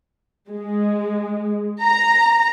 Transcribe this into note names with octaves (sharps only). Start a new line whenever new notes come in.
G#3
A#5